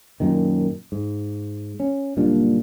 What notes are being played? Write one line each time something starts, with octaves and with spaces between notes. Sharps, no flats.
F#2 A#2 D#3
G#2
C#4
F#1 A#2 G3 D4